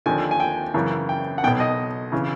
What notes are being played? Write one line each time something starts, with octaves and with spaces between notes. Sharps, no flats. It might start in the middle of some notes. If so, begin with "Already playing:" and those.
D#2 D3 F3 G#5
G#5
G5
F#2 C#3 E3
G5
F#5
B1 B2 G5
D#5
C#3 E3